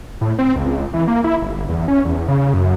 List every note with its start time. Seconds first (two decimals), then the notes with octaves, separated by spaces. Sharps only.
0.21 A2
0.39 C4
0.56 C#2
0.93 E3
1.08 A#3
1.24 E4
1.42 G1
1.69 E2
1.88 C#4
2.05 E2
2.28 C#3
2.54 F#2